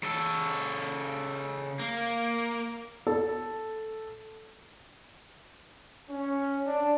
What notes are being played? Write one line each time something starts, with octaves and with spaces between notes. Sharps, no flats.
C#3 A4
A#3
A4
C#4
D4